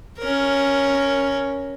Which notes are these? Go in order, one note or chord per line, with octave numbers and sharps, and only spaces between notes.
C#4 A#4